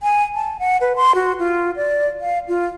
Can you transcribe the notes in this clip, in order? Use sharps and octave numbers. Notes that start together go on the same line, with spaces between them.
G#5
A5
F#5
B4
C6
F#4
F4
D5
F5
F4